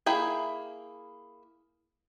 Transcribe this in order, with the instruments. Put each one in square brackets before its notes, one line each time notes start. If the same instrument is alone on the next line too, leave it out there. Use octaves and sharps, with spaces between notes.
[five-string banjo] A#3 E4 G#4 G5